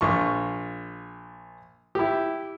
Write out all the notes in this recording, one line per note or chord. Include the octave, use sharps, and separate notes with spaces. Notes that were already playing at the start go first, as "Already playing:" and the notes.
A#1 F4 C#6
E4 G4